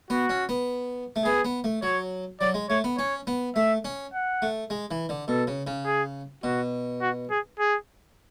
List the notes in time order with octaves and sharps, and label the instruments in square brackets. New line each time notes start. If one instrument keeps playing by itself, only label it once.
[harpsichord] B3 [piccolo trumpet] F#4
[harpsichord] C#4
B3
A3
[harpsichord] B3 [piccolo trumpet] G#4
[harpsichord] B3
A3
[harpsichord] F#3 [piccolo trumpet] C#5
[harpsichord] F#3 [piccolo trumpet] D5
[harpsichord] G#3
[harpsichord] A3 [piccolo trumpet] C#5
[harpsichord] B3
[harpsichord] C#4 [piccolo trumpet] C#5
[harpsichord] B3
[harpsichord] A3 [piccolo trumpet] E5
[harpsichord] C#4
[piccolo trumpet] F#5
[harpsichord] A3
G#3
E3
D3
[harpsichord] B2 [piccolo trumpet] A4
[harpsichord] C#3
C#3
[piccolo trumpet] G#4
[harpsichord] B2 [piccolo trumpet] F#4
[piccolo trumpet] F#4
G#4
G#4